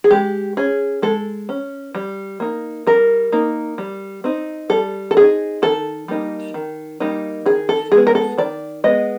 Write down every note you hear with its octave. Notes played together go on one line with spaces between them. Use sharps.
G#4
G#3 G4
C#4 G#4
G#3 A4
C#4
G3
A#3 D#4
G3 A#4
A#3 D#4
G3
C4 D#4
G3 A4
A4
C4 D#4 G#4
D#3 A4
G3 A#3 D#4
D#3
G3 A#3 D#4
D#3 G#4
A4
G#3 B3 G#4
A#4
A4
D#3 D5
G#3 B3 D#5